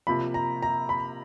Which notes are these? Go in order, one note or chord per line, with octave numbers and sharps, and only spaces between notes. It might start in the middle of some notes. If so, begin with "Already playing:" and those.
C3 F3 A#3 B5
A#5
A#5
B5